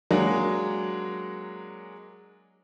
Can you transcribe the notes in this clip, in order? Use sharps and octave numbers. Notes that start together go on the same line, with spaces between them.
F#3 G#3 A#3 D4